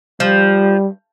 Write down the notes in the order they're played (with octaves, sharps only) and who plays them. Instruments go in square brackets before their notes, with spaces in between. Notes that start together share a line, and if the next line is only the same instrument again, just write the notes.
[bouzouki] F3 [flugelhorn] G3